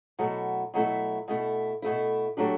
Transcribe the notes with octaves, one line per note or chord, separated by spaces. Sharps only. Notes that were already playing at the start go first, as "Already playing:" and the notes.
B2 F#3 A3 E4
B2 F#3 A3 E4
B2 A3 E4
B2 A3 E4
F#3 A3 D4 G4